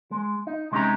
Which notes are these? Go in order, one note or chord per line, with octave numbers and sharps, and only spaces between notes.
G#3
D#4
C3 G#3 C#4 D#4 G4 A#5